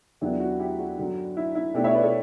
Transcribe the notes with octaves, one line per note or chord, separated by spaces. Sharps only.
E2 D3 F#3 B3 D4 E4 G4
F#4
E4 G4
F#4
G2 D3 F#3
E4
E4
B2 A3 D4 E4 G4
C#5 E5
B4 D5
A4 C#5